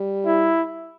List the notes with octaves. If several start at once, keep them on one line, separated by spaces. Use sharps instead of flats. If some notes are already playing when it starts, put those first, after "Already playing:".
Already playing: G3
E4